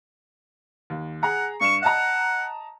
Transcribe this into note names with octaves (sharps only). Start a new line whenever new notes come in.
D#2
G#4 F#5 A#5
G2 C#6 C#7 E7
D#5 F#5 A5 A#5